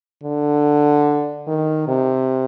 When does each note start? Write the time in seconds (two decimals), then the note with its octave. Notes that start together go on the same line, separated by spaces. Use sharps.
0.24 D3
1.47 D#3
1.88 C3